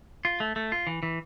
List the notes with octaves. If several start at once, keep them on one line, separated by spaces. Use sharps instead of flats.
F4
A3
A3
F4
E3
E3